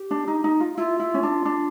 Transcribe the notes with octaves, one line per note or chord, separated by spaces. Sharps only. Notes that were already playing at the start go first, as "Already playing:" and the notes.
Already playing: G4
D4
D#4
D#4
F4
E4 F4
E4
C#4
D4
D4